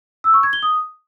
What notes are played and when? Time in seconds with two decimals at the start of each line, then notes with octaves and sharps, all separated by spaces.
0.24 E6
0.34 C#6
0.43 G#6
0.53 G7
0.63 D#6